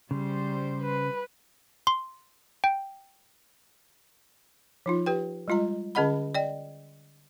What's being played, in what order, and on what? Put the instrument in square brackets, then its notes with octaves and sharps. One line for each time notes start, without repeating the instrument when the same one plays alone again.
[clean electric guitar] C#3 [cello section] G3 C5
[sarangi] B4
[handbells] C6
G5
[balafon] F3 D#4 F4
G4 B4 G5
G3 G#3 F4 D#5 A#5
D3 C#4 G#4 D#5 F#5 B5
D5 D#5 G5